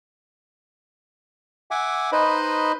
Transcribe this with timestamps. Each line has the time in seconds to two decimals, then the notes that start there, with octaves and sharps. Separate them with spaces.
1.71 E5 F#5 G#5 D6
2.12 D#4 B4 C5 D#5 B5